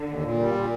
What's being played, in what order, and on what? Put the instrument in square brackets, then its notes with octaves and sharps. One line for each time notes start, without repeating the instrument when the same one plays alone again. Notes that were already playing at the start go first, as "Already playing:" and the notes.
Already playing: [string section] D3
[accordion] D#2
A#2
G3
A#2